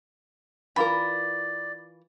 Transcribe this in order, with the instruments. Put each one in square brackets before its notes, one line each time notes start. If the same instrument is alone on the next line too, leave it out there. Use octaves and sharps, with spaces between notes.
[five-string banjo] E3 F4 A#4 [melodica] D5 [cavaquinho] B5